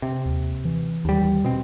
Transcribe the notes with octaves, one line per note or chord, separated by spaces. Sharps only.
C3
D#2
E3
D#2 G3
B2 C4